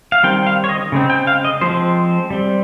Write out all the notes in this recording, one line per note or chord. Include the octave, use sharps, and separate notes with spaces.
F5
D#3 G3 C4 G5
F5
C#5
D#5
C#3 G#3 C4
G5
F5
D#5
F3 G#3 C4 C5
G3 C4